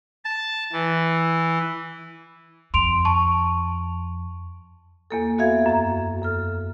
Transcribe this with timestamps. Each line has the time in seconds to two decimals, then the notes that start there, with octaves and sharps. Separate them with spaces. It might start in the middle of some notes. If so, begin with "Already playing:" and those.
0.25 A5
0.72 E3
2.74 F2 C6 D7 F7
3.05 A5 C#6
5.11 E2 A#3 A4
5.38 B3 F#4 A4 E5 F5 G#6
5.66 F#2 A#5
6.22 F#2 A4 F6